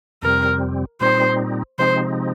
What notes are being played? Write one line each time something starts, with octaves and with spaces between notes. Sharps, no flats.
F2 C3 G3 C4 A#4
A#2 G3 C4 D#4 C5
C3 F3 G#3 C4 D#4 C5